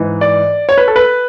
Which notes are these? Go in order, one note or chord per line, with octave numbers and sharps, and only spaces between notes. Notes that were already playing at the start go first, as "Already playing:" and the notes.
Already playing: G#2 E3
D5
C#5
B4
A4
B4